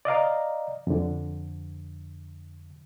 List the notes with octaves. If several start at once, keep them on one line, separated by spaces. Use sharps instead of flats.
D5 D#5 F5 A#5
F2 D3